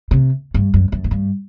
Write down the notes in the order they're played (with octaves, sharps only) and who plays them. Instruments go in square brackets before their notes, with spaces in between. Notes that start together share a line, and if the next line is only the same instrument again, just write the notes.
[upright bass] C3
G2
F#2
F#2
A2
G2